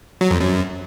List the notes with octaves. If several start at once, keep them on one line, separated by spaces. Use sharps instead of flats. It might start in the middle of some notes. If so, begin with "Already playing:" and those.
F#3
F2
F#2